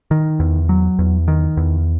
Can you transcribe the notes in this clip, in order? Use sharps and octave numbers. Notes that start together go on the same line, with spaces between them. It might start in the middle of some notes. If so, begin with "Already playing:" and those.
D#3
E2
F#3
E2
D#3
E2